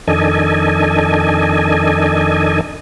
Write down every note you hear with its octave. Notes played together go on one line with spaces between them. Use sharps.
F2 D#3 D4 A4 D#5 G#5